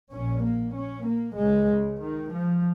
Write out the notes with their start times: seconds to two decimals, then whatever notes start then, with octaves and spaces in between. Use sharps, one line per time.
0.12 A#1 A#2 C#4
0.44 A#3
0.75 C#4
1.06 A#3
1.37 C#2 C#3 G#3
1.69 C#3
2.00 D#3
2.32 F3